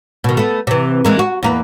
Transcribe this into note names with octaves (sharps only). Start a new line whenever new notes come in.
B2 D#3
A3 B3
C3 E3
E3 G#3 A#3
F#4
E2 A#3 B4